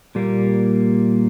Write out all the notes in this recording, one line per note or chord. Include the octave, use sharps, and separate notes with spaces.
A#2 G3 A#3